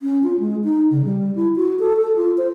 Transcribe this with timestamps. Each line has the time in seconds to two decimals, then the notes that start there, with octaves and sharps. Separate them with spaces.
0.01 C#4
0.23 F4
0.40 G#3
0.64 D#4
0.91 C#3
1.05 G3
1.36 E4
1.56 F#4
1.80 A4
1.97 A4
2.16 F4
2.38 C5